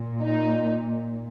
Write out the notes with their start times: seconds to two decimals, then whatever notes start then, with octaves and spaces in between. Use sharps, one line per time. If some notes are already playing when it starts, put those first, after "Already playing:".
Already playing: A#2
0.21 D#4